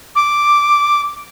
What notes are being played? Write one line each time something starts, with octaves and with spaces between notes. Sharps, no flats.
D6